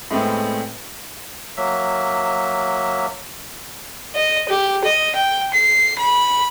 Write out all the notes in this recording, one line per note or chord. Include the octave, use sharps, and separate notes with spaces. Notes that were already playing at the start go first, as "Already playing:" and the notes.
A2 G#3 A3 B3 C4
F#3 A#3 E5
D#5
G4
D#5
G5
C7
B5